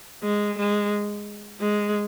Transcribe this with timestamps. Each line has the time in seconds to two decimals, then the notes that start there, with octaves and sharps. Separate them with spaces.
0.23 G#3
0.58 G#3
1.61 G#3